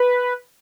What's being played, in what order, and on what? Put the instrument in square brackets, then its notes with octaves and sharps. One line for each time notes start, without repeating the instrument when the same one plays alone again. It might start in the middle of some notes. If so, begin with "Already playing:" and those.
Already playing: [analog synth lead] B4